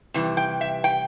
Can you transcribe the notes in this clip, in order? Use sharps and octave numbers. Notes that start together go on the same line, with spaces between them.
C3 E3 G3
G5
E5
G5